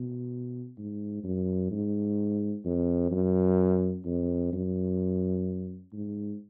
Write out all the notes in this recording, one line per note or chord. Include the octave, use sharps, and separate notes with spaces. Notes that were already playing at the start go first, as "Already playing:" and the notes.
Already playing: B2
G#2
F#2
G#2
F2
F#2
F2
F#2
G#2